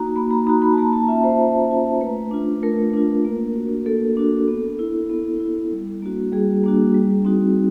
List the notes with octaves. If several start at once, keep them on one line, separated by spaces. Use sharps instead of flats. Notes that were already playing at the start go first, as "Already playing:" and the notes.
Already playing: A#3 D#4 F#4 A#5
A#3 B5
A#5
D#4 F#4 A#5
B5
A5
A#3 A#5
A5
C#4 F4 E5
C5
A#3
C#4 F4
A3 B4
D4 F4
A3 A#4
D4 F4
A#3
D4 F#4
A#3 A4
D4 F#4
B3
E4
B3
E4
G3
A#3 D4 F#4
G3 G#4
A#3 D4 F#4
G3
C4 D#4 F#4